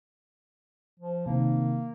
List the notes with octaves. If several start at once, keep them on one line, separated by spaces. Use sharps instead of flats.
F3
C3 D#3 A#3